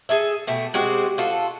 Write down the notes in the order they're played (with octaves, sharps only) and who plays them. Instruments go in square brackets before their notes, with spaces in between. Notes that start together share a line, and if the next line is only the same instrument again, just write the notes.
[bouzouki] G#4 A4 E5
B2 A3 G4
G#3 C4 F#4 G4
F4 F#4 A4